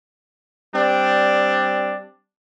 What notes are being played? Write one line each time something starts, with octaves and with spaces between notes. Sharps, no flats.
G3 C4 D4